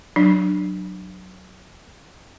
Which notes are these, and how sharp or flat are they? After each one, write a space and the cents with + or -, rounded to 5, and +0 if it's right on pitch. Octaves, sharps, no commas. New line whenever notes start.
F#3 +5 D4 +20